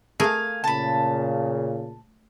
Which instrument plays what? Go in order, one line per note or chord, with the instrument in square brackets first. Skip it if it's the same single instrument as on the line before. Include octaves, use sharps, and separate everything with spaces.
[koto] A3 G#4 A#4 [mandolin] F5 G#5
[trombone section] A#2 C#3 [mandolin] A5 B5